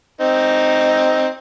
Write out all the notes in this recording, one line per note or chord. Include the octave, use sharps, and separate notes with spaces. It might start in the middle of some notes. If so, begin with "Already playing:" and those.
C4 D#4